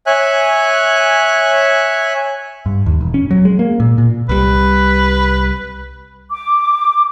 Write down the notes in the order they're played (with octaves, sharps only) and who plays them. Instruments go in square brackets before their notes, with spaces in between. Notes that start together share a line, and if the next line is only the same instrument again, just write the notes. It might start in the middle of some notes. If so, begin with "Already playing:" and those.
[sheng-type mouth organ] C#5 E5 G#5 F#6
[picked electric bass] G2
D#2
E1
C#4
F#3
G#3
A#3
A#2
A#2
[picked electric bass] C2 G3 [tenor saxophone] B4
[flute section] D6